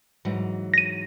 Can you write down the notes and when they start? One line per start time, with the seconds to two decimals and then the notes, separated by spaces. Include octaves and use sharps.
0.25 G#2 E3 F#3
0.74 A#6 D#7